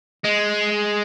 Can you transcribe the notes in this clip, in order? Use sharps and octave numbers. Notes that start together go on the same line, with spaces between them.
G#3